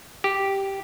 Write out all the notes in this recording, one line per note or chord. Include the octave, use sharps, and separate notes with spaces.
G4